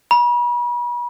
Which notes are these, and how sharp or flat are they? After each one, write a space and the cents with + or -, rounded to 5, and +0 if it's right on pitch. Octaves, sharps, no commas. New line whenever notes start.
B5 -40